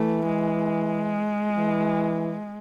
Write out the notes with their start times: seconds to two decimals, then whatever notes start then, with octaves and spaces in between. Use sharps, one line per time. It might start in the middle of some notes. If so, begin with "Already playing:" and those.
Already playing: E3 A3
0.26 G#3
1.57 E3